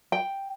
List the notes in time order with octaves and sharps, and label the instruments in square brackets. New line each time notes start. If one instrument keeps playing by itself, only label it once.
[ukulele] G5